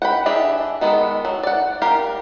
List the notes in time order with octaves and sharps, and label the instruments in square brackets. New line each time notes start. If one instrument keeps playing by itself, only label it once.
[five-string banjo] F#5 G5 B5
E3 D4 G4 G#4 E5
D#3 G#3 B3 A4
F#3
D5 F#5
G4 A#4 F5